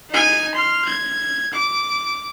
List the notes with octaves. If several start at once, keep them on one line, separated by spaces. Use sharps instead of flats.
D#4 G#5
C6 F6
G#6
D6